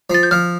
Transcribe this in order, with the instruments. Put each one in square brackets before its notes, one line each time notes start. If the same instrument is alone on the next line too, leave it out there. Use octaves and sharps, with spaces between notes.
[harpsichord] F3 [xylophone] A6
[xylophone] G6
[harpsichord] F3 [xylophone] F6